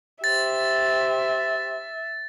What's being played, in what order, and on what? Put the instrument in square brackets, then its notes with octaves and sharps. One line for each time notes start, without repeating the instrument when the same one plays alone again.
[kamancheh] G4 C5 [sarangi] E5 [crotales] A6